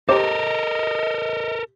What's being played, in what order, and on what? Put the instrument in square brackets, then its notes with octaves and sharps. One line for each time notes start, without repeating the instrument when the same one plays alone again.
[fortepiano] G4 C5 D6 [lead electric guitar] A4 A#4 [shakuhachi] D#5